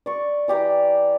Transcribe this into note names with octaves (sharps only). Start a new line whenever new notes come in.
D5 C#6
E3 G4 D5 A#5